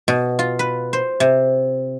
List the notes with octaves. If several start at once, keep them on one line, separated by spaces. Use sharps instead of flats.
B2
F4
B4
C5
C3